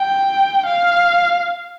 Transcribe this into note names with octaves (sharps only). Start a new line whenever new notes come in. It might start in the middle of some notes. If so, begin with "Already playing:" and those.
Already playing: G5
F5